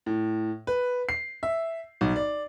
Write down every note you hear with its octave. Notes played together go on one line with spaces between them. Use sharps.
A2
B4
C7
E5
B1
D5